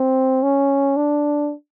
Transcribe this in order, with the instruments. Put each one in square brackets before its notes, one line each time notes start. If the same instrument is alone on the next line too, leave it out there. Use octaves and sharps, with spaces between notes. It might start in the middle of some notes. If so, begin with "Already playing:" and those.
Already playing: [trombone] C4
C#4
D4